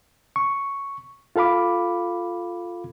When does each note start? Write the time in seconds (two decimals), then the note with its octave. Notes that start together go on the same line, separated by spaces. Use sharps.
0.36 C#6
1.36 F4 A4 F5 B5 D6